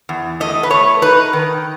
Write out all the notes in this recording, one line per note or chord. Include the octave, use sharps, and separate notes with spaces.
E2
A3 D#5
B4
A3 C#5
D#4 B4
D#3